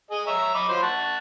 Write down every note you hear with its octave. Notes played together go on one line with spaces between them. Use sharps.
G#4 D#5
C#5 E5 A#5
D#5 B5 D6
F3 F#3 C5
F#5 A5 C#6